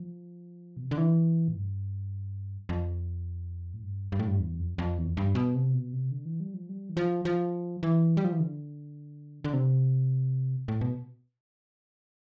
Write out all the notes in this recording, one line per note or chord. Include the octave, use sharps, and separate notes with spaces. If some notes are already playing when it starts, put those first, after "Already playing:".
Already playing: F3
B2
C3
D3
E3
A2
G2
F2
A2
G2
G2
A2
G2
E2
F2
F2
E2
F2
G2
B2
C3
B2
C3
D3
E3
G3
F3
G3
E3
F3
F3
E3
G3
F3
E3
D3
D3
C3
A2
B2